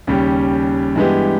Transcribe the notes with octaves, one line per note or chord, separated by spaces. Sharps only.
D#2 C#3 G3 C#4 G4
G2 E3 G#3 B3 G4